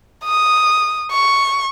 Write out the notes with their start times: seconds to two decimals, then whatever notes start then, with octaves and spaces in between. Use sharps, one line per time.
0.24 D#6
1.11 C#6